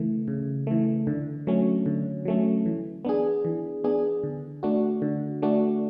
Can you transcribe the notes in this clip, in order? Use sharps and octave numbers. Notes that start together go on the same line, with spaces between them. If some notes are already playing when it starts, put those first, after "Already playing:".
Already playing: C#3 E3 A3
C#3
E3 A3
D3
F#3 A3 C#4
D3
F#3 A3 C#4
E3
B3 D4 G#4
E3
B3 D4 G#4
D3
A3 D4 F#4
D3
A3 D4 F#4